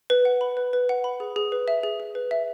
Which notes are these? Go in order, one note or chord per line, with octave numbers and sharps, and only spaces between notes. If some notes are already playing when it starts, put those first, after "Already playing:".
B4
F#5
B5
B4
B4
F#5
B5
G#4
G#4
B4
E5
G#4
G#4
B4
E5